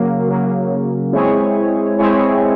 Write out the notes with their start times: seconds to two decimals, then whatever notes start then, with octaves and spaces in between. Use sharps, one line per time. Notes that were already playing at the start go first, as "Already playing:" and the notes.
Already playing: C#3 F#3 A#3
0.28 C#3 F#3 A#3
1.12 G#3 C4 E4 G#4 C#5
1.98 G#3 C4 E4 G#4 C#5